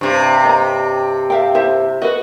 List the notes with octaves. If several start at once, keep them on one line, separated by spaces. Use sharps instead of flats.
G2 C3
D#5 A#5
E5 F5 G5
E4 C5 E5
F#4 B4 D#5